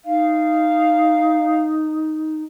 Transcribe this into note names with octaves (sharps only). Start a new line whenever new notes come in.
D#4 F5